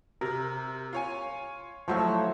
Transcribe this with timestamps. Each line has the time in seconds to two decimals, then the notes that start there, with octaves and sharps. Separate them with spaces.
0.21 C3 A#4
0.93 F4 C#5 G#5
1.88 F3 F#3 A3 E4 C5 C#5